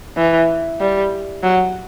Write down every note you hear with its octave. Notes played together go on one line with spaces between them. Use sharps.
E3
G3
F#3